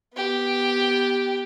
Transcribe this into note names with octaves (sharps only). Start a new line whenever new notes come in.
B3 G4